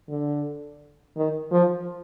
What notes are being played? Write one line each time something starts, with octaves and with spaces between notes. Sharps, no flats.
D3
D#3
F3